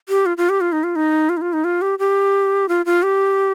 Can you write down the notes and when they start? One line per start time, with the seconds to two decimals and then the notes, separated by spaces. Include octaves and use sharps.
0.09 G4
0.26 F4
0.37 F4
0.49 G4
0.61 F4
0.72 D#4
0.84 F4
0.96 D#4
1.29 F4
1.37 D#4
1.41 F4
1.53 D#4
1.64 F4
1.82 G4
1.99 G4
2.69 F4
2.86 F4
3.03 G4